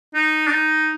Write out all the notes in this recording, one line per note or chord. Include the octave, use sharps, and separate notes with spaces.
D#4
D4
D#4